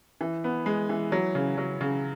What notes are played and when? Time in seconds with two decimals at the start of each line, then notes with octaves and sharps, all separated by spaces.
0.21 E3
0.44 B3
0.66 G#3
0.89 E3
1.12 F#3
1.35 C#3
1.58 F#3
1.81 C#3